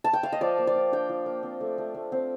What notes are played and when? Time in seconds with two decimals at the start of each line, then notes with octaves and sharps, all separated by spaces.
0.04 A5
0.13 G5
0.23 F5
0.32 D#5
0.41 F3 D5
0.58 A#3
0.67 D5
0.76 F4
0.92 D4 G5
1.09 F3
1.26 A#3
1.43 C4
1.61 A3
1.78 A3
1.95 A3
2.12 C4